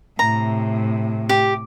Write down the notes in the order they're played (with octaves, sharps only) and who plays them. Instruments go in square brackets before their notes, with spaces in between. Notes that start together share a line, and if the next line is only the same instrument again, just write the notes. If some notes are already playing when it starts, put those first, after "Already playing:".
[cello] A2 C3 [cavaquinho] A#5
[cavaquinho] G4